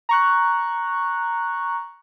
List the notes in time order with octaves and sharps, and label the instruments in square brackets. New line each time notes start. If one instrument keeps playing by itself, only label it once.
[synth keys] A#5 C#6 F#6